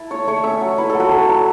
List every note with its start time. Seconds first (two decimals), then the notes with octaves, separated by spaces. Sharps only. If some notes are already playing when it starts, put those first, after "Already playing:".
Already playing: E4 A5
0.10 A3 C#5
0.27 A3 C#5
0.44 C#4 E5
0.61 F#3
0.78 E4 B4
0.90 A4
0.95 F#3
1.00 F#4
1.11 C#4 A4
1.29 F#3